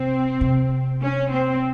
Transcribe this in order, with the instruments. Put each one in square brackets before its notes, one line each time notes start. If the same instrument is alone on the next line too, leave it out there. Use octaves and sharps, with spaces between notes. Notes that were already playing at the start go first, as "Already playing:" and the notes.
Already playing: [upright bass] C3 [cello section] C4
[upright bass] C3
[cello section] C#4
C4